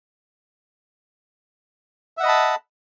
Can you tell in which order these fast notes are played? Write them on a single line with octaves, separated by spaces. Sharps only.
E5 F#5 D#5 B5 A5